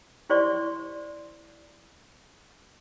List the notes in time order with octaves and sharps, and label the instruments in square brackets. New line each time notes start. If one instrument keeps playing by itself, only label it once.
[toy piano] E4 G4 C5 D5 C6 C#6